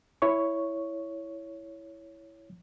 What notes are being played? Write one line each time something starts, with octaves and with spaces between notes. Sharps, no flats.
E4 C#5 C#6